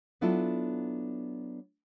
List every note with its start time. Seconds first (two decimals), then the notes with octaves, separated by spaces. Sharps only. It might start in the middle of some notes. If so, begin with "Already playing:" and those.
0.21 F#3 B3 D4 E4 F4 A4